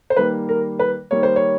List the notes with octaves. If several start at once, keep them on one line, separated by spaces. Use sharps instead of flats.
C5
D#3 G3 A#3 B4
A#4
B4
D#3 G3 A#3 C#5
C5
C#5